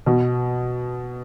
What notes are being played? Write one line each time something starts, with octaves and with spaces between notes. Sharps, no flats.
B2